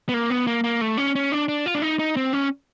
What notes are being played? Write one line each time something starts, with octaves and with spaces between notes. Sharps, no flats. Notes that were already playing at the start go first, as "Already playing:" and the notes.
B3
A#3
B3
A#3
A#3
A3
C#4
C#4
D4
D4
F4
D4
D#4
D#4
C4
C#4